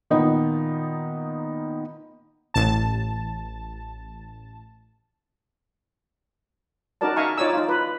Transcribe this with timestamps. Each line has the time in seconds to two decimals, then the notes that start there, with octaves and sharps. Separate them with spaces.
0.10 A#2 D#3 B3 D#4
2.54 A1 A5
7.01 C#4 D#4 F#4 A#4 D5 A5
7.16 D#4 E5 F5 G#5 A#5 C#6
7.38 D#4 F4 C#5 D5 G#5 E6
7.53 D#4 F4
7.69 F4 B4